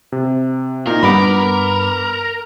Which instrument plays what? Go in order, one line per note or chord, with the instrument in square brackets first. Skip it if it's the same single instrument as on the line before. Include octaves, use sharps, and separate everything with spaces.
[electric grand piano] C3
[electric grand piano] A#2 D#4 [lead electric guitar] A#4
[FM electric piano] G2 B3 D6 [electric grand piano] F#5 B5